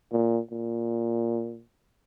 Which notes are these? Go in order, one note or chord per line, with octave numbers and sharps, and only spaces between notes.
A#2
A#2